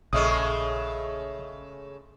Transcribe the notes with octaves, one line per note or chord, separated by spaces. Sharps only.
A#1 C#3 G#3 A3 D#5 E5 D#6